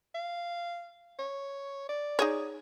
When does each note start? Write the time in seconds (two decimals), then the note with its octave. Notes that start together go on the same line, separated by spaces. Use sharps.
0.15 F5
1.19 C#5
1.89 D5
2.19 D#4 G#4 C#5